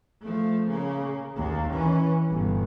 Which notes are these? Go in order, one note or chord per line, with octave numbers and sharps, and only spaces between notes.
F3 A3
C#3 A#3
D#2 A#3
E3 C#4
G1 B2